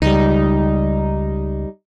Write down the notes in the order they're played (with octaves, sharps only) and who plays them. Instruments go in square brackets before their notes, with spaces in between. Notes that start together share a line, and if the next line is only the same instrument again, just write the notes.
[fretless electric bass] C#2 [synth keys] G3 D#4